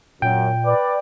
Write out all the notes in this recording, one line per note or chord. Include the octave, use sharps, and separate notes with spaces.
F#2 A#2 G5
B4 D5